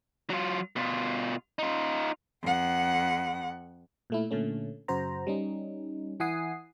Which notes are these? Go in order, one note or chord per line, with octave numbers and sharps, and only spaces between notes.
F#3 F4
B2 F4
D#4 F4
F2 F#5
A#2 A3 E4
A#2 D3 A3 C#4
F#2 C#3 F#4 C5 A#5
G3 C#4 D#4
E3 E4 F#5 G#5 D#6 C7